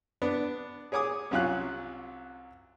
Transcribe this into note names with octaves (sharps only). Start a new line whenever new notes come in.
B3 D4
G#4 C#5 G#5 D6 D#6
C2 F#3 C#4 F4 F5 F#6